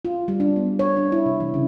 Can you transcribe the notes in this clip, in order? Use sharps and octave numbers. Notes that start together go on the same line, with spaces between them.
F4
G3
D4
B3
C#5
D4
E4
C3
E3
C#3